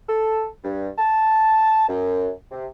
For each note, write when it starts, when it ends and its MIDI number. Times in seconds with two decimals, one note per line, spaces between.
0.08 0.46 69
0.63 0.88 43
0.98 1.85 81
1.88 2.29 42
2.51 2.66 48